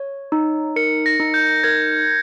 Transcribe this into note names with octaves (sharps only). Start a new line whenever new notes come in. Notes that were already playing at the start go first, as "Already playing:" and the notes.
Already playing: C#5
D#4
A#4 C#7
A#6
D#4
G6
A#4 G#6